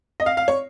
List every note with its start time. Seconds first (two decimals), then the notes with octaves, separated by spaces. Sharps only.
0.20 D#5
0.26 F5
0.37 F5
0.48 C#5